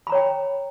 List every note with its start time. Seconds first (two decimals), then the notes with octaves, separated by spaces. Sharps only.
0.07 B5
0.10 A#5
0.12 C#5
0.15 G5